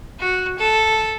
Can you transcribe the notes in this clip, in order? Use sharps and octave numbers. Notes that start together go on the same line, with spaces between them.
F#4
A4